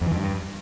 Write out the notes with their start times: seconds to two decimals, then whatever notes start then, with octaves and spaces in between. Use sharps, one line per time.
0.01 F2
0.06 E3
0.11 F2
0.17 G2